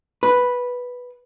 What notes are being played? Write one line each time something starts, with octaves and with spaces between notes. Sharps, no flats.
B4